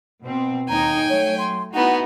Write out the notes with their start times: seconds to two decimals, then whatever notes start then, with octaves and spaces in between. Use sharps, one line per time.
0.23 B2 C4
0.69 D#2 D#4 G5 G#5 A#5
1.10 F#3 A3 C#5
1.38 C6
1.74 B3 D#4 E4 F#4 F#5